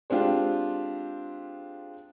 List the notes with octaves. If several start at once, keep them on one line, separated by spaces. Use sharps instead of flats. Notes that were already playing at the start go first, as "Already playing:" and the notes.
G#3 C4 D4 F4 G4